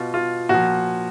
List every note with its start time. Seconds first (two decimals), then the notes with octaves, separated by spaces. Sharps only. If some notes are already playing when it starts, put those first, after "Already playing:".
Already playing: B2 F4
0.14 F4
0.49 A#2 F3 F#4